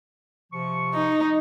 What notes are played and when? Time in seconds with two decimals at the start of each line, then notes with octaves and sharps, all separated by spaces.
0.52 C3 F3 C#6
0.94 D#4